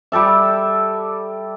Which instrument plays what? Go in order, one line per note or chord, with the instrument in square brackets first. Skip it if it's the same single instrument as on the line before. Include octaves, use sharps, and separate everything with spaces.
[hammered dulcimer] G3 G4 A4 E5